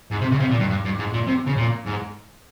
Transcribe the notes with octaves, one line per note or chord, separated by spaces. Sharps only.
G#2
C3
C#3
C3
A#2
G2
G2
G2
G#2
A#2
C3
C#3
A#2
G#2